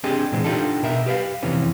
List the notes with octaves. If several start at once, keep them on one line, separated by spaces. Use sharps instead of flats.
C4 D4 G4 G#4 D#5
A#2 E3 G#3 C4
D4 D#4 F4 G4 A4
B2 A#4 E5
G4 B4 D5 F5
F2 C3 E3 C#4